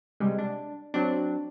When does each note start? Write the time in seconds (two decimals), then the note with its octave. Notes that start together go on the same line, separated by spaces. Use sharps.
0.20 C3 G3 G#3
0.39 D4
0.94 F#3 C4 D4